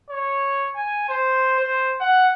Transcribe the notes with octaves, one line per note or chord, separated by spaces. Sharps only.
C#5
G#5
C5
C5
F#5